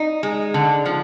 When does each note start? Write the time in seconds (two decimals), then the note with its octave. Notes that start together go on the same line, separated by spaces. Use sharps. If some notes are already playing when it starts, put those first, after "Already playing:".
Already playing: D#4
0.23 G#3
0.54 D3
0.86 F3